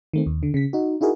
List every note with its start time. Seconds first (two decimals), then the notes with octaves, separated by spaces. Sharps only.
0.13 D#3 A3 C4
0.26 D#2
0.43 D3
0.54 C#3 B6
0.73 D#4 F#4
1.01 D#4 E4 F#4 G#4 A#4